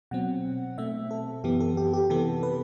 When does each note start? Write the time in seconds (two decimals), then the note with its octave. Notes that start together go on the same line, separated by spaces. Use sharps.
0.11 B2 F#3 C4 F#5
0.78 B2 A3 C4 E5
1.11 A4
1.44 F#2 E3 B3 G4
1.60 A4
1.77 G4
1.93 G4
2.10 C3 E3 B3 A4
2.43 B4